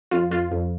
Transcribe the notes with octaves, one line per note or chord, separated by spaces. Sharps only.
F2 F4
F2 F4
F2